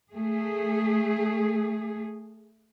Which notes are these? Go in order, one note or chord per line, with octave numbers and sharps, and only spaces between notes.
A3 G#4